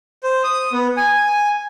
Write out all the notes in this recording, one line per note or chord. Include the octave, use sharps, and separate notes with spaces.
C5
D#6
B3
G#5